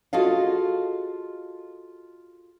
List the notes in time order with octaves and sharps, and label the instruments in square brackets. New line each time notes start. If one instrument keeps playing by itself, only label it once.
[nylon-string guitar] F4 F#4 G#4 A4 D#5 F5